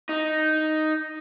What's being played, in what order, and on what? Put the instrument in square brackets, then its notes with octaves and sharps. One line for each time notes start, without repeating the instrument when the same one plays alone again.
[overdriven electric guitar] D#4